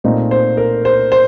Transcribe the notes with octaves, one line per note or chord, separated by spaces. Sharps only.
A#2 A3 C4 D#4
C5
A#4
C5
C5